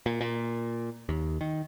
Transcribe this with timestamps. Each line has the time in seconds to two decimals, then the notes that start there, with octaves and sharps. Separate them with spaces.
0.06 A#2
0.21 A#2
1.09 D#2
1.41 D#3